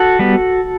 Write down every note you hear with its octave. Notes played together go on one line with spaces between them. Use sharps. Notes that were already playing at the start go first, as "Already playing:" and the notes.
Already playing: F#4 A4
G3 B3